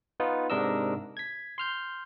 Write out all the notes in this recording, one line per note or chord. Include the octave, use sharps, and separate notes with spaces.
B3 D#4 F4 B4
G#2 C3 D4 A#4 D#5 E6
G#6 B6
C6 F6 G6